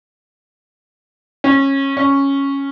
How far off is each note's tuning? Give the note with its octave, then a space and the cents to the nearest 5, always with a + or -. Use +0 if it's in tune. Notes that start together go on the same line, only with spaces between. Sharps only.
C#4 -20
C#4 -5